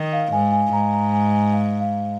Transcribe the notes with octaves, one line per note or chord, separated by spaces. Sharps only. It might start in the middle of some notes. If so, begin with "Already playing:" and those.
Already playing: D#3
F5
G#2 G#5
G#5
G#2 A#5
A#5
G#5
G#5
F5
F5